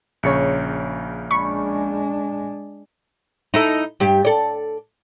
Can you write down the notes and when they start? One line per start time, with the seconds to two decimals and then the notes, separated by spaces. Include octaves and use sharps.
0.23 A#1 C#3 C#5 C#7
1.31 G#3 D4 B5 C#6
3.54 D#4 E4 A4
4.00 G2 G4
4.25 A4 D5